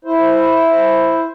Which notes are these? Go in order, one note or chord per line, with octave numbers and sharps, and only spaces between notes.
E4 C5